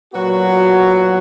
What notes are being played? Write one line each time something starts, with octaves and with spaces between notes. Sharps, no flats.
A#2 F#3 B3 F#4